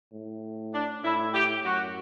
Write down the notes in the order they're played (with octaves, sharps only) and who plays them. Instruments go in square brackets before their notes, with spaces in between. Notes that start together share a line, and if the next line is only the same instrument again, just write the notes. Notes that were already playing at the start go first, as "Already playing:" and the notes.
[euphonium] A2
[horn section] D4
[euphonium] A2 [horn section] E4
[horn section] G4
[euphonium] F#2 [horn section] F#4